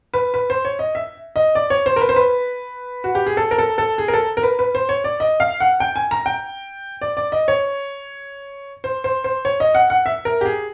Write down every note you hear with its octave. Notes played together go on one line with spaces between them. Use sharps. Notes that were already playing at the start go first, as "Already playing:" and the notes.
B4
B4
C5
C#5
D#5
E5
D#5
D5
C#5
C5
A#4
B4
C5
B4
F#4
G4
G#4
A4
A#4
A4
A4
G#4
A#4
A4
A#4
B4
B4
C5
C#5
D5
D#5
F5
F#5
G5
G#5
A#5
G5
D5
D5
D#5
C#5
C5
C5
C5
C#5
D#5
F#5
F#5
E5
A#4
G4
G#4